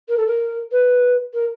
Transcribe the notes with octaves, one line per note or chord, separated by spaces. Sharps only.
A#4
A4
A#4
B4
A#4